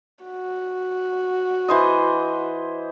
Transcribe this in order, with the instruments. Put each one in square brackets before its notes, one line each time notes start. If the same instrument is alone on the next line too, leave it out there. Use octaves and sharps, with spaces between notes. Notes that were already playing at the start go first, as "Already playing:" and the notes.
[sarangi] F#4
[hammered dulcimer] E3 C5 D#5